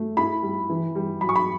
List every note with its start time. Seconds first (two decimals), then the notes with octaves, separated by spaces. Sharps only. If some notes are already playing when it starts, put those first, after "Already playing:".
Already playing: A3
0.17 E4 B5
0.43 G3
0.69 E3
0.95 G3
1.21 F#3 B5
1.29 C#6
1.36 B5